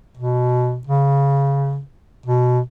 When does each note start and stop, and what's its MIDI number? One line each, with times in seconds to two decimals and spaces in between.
0.17 0.81 47
0.87 1.81 49
2.26 2.60 47